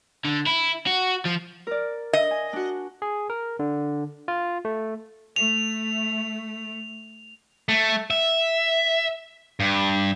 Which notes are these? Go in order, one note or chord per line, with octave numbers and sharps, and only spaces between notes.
D3
E4
F#4
F3
A#4 D5
D#5
G#5
D4 F#4
G#4
A#4
D3
F4
A3
A3 F7
A3
E5
G2